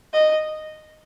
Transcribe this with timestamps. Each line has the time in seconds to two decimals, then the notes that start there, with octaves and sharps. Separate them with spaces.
0.13 D#5